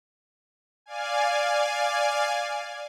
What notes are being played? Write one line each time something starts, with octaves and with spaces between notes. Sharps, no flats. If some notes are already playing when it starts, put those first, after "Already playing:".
D5 F5 G#5